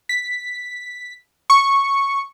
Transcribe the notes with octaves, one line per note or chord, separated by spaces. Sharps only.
B6
C#6